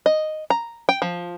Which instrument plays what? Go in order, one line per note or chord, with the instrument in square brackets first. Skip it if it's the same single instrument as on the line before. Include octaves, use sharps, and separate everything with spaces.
[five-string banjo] D#5
A#5
G5
F3